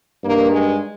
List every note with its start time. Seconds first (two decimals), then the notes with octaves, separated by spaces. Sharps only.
0.23 G2 D#3 A#3
0.51 G#3